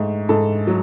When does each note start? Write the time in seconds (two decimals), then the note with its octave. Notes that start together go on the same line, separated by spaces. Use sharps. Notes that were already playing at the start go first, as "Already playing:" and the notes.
Already playing: G#2 A3
0.29 G#2 A4
0.67 F#3